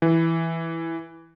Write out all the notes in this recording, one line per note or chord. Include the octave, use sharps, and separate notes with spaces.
E3